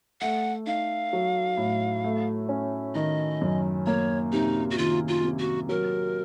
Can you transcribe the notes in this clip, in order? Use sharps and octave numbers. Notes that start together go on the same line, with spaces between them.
A3 F#5
D#4 F5
F#3
A2
A3
C#4
D#3 D#5
F#2
A#3 C#5
C3 D#4
F#4
D#3 F4
F4
C3
F#4
F#3 A#4